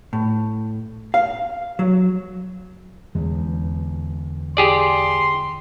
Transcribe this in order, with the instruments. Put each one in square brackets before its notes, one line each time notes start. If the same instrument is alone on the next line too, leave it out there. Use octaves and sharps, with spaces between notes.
[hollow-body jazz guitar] A2
F5
F#3
[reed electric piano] E2 [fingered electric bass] D3 G#3
[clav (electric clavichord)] G4 G#4 D5 [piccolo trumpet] C6